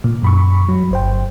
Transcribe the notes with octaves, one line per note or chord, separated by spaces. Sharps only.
A#2
F#2 B5 C#6
F#3
G1 C5 G5